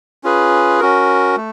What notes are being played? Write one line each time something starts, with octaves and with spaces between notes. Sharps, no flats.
C#4 F4 G#4 B4
C#4 F#4 A#4
A3